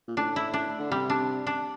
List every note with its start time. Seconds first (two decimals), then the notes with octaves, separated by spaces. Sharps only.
0.08 A#2
0.17 A2 D4
0.36 E4
0.54 D4
0.79 D3
0.91 C3 G3
1.10 D4
1.47 D4